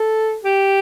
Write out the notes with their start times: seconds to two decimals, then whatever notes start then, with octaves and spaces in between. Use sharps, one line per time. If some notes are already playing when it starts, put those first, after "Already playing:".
Already playing: A4
0.44 G4